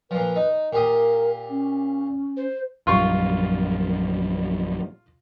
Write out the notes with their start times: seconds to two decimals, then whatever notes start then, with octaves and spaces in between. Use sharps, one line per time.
0.11 A#2 F3 B4
0.36 D#4
0.73 A#2 G4 A#4 D#6
1.50 C#4
2.37 C5
2.87 A#1 F#2 G3 F4 C6 C#6